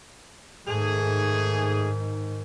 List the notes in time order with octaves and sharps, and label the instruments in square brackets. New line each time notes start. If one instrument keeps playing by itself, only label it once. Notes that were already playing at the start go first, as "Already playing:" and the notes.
[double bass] G#2 D#3 [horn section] A3 G#4